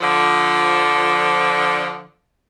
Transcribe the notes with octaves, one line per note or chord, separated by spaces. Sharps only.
D3 F3